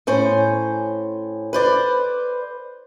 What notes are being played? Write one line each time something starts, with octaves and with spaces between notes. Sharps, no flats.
A2 C#4 C5
B4 C5 D5